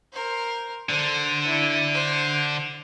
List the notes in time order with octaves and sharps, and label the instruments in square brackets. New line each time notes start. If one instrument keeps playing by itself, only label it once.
[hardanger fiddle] A#4 C5
[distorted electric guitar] D3 [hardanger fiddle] C5
[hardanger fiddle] D4 E4
C5